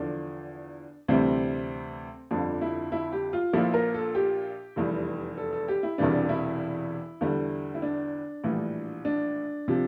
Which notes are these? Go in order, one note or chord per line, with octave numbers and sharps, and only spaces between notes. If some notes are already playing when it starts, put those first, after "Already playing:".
Already playing: E2 D3 F3 D4
D2 C3 E3 G3 C4
G1 F2 D3 F3 D4
E4
E4
G4
F4
A#1 A#2 F3 E4
A#4
A4
G4
F1 E2 E3 G3
A4
A4
G4
E4
E1 E2 C3 E3 G3 D4
E4
E2 D3 G3
E4
D4
A#1 A2 E3 G3
D4
C3 F3